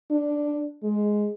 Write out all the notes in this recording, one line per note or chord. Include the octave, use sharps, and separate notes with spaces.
D4
G#3